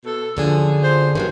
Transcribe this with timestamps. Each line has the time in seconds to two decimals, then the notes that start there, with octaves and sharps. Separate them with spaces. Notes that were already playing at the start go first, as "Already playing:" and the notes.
0.04 B2 A4
0.37 F#2 D3 F3 G#4
0.82 F4 C5
1.15 G2 D#3 E3 F#3